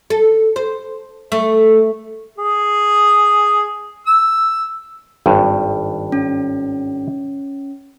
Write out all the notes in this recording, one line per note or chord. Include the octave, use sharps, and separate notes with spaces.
A4
C5
A3
G#4
E6
G#1 G2
C#4